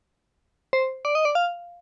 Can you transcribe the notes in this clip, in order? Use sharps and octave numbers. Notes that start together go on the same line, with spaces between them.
C5
D5
D#5
D5
F5